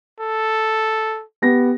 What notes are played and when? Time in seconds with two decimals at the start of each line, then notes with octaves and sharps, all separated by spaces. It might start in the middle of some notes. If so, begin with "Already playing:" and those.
0.20 A4
1.42 B3 G4 A#6